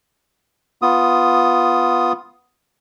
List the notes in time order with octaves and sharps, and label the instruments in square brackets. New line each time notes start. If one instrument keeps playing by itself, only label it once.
[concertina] B3 F4 D#6